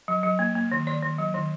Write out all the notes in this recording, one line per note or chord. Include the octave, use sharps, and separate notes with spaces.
F#3
F#3
A#3
A#3
D#3
D#3 D5
D#3
F#3
D#3